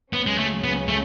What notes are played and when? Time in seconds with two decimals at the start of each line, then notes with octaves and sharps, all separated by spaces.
0.13 C#2 C#3 F#3 B3 C#4
0.26 G#3
0.38 A3
0.64 B3
0.88 A3